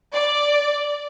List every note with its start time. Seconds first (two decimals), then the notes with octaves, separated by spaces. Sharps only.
0.14 D5